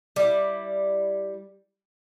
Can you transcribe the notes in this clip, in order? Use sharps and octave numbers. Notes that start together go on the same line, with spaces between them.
G3 E4